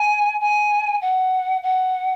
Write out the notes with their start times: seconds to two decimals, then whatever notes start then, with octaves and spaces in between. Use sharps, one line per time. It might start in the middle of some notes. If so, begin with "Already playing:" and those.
Already playing: G#5
0.41 G#5
1.02 F#5
1.63 F#5